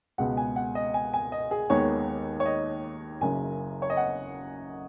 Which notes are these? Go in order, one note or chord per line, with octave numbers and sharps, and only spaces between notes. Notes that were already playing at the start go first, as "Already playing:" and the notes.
C#2 B2 G#3 B3 F#5
G#5
F#5
D#5
G#5
G#5
D#5
G#4
D#2 D#3 G#3 B3 C#5
C#5
D#5
F#1 F#2 C#3 G#5
C#5
D#5
F#5